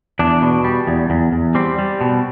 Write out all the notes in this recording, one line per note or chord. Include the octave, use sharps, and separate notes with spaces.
E2 D4
B2
G3
E2
E2
E2
G3 C4
G3
B2